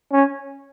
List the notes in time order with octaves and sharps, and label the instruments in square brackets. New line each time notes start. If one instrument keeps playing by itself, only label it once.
[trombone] C#4